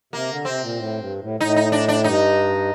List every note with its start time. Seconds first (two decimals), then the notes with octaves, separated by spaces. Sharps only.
0.13 C3 A#3
0.29 D3
0.45 C3 C4
0.61 A#2
0.76 A2
0.98 G2
1.20 A2
1.40 A2 D#4
1.56 D#4
1.72 D4
1.88 D4
2.04 G2 D#4